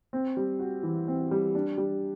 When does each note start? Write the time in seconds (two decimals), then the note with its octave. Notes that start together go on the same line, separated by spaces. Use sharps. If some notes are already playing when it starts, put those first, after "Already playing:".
0.13 C4
0.37 G3
0.59 F#4
0.83 E3
1.08 C4
1.31 G3
1.55 D4
1.78 G3